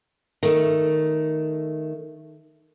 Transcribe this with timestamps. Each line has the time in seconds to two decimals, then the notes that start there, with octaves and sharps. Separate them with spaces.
0.43 D#3 A3